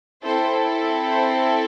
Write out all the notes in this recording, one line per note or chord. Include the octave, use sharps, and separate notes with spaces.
C4 E4 A4 C5
C5